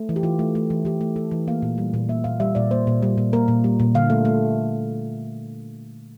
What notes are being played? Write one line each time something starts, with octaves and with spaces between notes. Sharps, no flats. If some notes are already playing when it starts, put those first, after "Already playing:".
Already playing: A3
E3
G4
E3 F4
A3
A3
E3
E3 G4
A3
A3 A4
E3
A#3 F5
A#2
G3
A#2
A#3 E5
A#2 F5
G3 E5
A#2 D5
A#3 C5
A#2
G3
A#2
A#3 A#4
A#2
G3
A#2
D3 F5
A3
A3